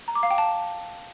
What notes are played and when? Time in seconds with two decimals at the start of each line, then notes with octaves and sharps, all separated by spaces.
0.08 A#5
0.15 D6
0.23 F5
0.31 G5
0.38 A5